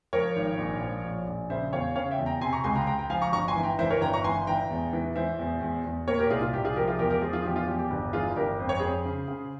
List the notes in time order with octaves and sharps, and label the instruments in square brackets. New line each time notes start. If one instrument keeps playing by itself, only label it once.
[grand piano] F3 A#4 C#5
G#1
A#1
F3
A#1
A#1
C#3 C5 E5
E2 C#5 F5
C#3 C#5 F5
E5 G5
E2
G5 A#5
C3 G#5 C6
A#5 C#6
C#2 G#5 C6
G5 A#5
C6
C#2 G5 A#5
G5 A#5
F3 F5 G#5
A#5 C#6
G1 A#5 C#6
G#5 C6
E3
G5 A#5
E3 C5 E5
A#4 C#5
G1 G5 A#5
A#5 C#6
E3 G#5 C6
E3 G5 A#5
E2
E3
E3 C5 E5
E2
E2
E2
A#2 A#4 C#5
G4 A#4
C2 F4 G#4
F4
C2 G4
F4 G#4
F3 G4 A#4
F4 G#4
E2 G4 A#4
G4 A#4
F3 F4 G#4
F4 G#4
E2 G4
F4
E2 G4
G4
G1 G4
E3 F4 G#4
G1 G4 A#4
F2 C5
C#5
F2 G#4 C5
C#3
C#3